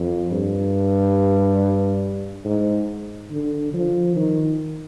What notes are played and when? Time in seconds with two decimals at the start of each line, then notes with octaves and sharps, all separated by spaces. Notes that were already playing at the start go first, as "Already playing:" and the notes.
Already playing: F2
0.32 G2
2.45 G#2
3.31 D3
3.74 F3
4.16 D#3